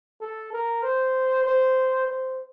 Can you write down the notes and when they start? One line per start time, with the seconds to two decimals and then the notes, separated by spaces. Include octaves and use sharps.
0.21 A4
0.53 A#4
0.83 C5
1.45 C5
2.07 C5